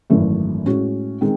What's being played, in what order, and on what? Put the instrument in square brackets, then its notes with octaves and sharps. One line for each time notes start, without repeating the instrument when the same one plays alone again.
[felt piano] G#1 F#2 E3 A3
A2 G#3 C#4 F#4
D#3 G#3 C4